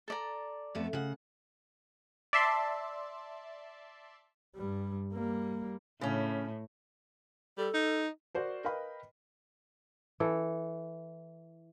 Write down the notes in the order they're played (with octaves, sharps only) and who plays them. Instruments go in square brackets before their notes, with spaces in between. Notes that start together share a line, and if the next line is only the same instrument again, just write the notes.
[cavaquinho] A4 D5 A#5
[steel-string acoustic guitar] F2 A3 B3
C#3 F#5
[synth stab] D5 E5 A5 C6
[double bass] G2 G3
G3 A#3
[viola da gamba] A2 [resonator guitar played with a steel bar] C#3 C#4
[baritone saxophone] G3 [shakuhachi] A4
[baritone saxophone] D#4
[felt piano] F#4 A#4 C5 D5
A#4 B4 D#5 F5 G5 B5
[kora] E3 A4